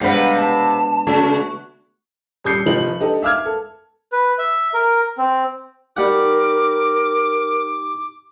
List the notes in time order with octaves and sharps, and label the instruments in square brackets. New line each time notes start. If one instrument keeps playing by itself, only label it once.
[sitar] C3 B4 [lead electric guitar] G3 [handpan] G#3 B3 D4 [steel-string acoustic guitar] F5 F#5
[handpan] B3 [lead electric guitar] A5
[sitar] C#3 [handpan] A3 F#4 [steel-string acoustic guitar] C#5
[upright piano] D#1 G3 D#6 G6 C7 C#7
F1 D#3 F3 D#4 G4 F#7
D4 D#4 G4 A4
E5 F5 D6 E6 F6 G#6
A4
[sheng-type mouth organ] B4
E5
A#4
C4
[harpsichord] G3 F#5 [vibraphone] D#4 [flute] A#4 [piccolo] D6